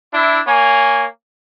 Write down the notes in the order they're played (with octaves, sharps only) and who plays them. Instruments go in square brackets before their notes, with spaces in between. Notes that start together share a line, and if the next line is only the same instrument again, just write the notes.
[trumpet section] D4 E4
A#3 C#5 G#5